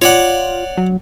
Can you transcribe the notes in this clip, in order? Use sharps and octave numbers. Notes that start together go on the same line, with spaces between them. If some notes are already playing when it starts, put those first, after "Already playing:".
F4 C#5 D5 F#5
F#3